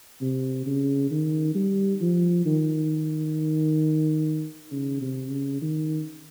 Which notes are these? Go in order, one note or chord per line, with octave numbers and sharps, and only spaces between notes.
C3
C#3
D#3
G3
F3
D#3
C#3
C3
C#3
D#3